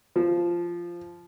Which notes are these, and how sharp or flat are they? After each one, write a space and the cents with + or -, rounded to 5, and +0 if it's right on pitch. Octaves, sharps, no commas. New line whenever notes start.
F3 -10